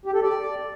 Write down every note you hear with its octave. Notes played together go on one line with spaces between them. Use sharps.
G4
A4
D5